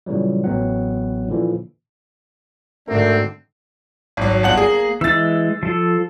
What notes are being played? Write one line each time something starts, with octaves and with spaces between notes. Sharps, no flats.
A#2 C#3 E3 F#3 G3
A1 F#3 B3 C4 F#5
A#2 D3 E3 F3 A#3
G#2 D3 A3 C4 D4 F#4 A#4
G#1 F#3
G1 F#5 F#7
A#3 G#4
E3 G#3 E6 A6
F3 A4